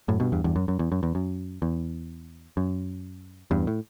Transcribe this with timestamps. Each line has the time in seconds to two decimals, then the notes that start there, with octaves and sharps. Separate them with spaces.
0.08 F#2 A2
0.20 G2 B2
0.32 E2 G2
0.44 E2 G2
0.56 F#2
0.68 F#2
0.79 E2
0.92 F#2
1.03 E2
1.15 F#2
1.62 E2
2.57 F#2
3.51 E2 G2
3.67 A2